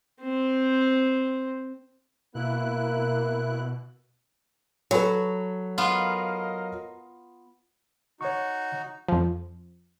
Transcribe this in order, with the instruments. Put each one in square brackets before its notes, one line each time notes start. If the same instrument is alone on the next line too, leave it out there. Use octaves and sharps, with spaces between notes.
[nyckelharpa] C4 C5
[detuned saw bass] B2 [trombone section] A#3 [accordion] E4 F#6
[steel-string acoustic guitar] F#3 [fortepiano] A4 B4 C#5
[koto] B3 F4 [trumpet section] A#4 D#5 F5
[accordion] D#4 F#4 [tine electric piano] C#5 C#6
[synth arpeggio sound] F2 F3